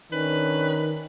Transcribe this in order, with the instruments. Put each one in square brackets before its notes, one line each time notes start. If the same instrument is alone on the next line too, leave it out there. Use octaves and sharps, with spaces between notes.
[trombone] D#3 [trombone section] C#4 D4 [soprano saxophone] B4